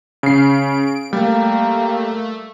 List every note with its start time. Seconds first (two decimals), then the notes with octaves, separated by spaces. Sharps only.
0.23 C#3 C7 D7
1.13 G3 A3 A#3